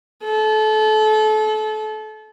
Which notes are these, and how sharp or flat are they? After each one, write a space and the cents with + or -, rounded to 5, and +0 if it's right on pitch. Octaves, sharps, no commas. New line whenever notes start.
A4 -30